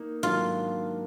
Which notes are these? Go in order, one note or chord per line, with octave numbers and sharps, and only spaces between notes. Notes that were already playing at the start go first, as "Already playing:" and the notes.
Already playing: A#3 D#4
G#2 D#3 F#3 A#3 D4 F4